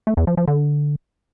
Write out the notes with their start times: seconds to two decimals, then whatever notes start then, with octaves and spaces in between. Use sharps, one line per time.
0.07 A3
0.17 E2
0.27 F3
0.37 F3
0.48 D3